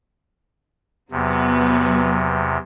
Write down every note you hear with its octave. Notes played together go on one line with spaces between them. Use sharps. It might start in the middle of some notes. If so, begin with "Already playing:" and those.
E2 C3 F#3 B3